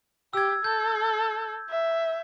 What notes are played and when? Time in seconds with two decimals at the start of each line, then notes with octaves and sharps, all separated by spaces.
0.33 G4 E6 G#6
0.64 A4 G6
1.70 E5